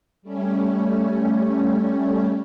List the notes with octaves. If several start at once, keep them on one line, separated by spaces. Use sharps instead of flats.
G3 A3 C#4